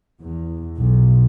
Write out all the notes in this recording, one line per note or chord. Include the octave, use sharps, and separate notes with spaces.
E2
B1